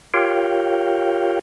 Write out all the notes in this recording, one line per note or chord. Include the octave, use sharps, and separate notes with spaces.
F4 G4 A#4 C#5 F5 G5